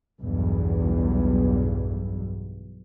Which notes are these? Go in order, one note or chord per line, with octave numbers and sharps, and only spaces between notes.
B1 E2 G2